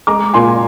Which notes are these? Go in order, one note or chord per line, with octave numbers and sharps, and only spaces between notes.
G#3 A#5 D6
A#2 G#5 C6